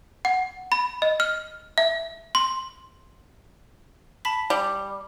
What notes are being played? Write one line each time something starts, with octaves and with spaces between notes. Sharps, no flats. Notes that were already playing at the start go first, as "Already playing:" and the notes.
F#5
B5
D#5
F6
E5
C6
A5 B5 B6
G3